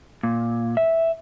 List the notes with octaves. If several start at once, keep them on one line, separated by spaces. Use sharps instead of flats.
A#2
E5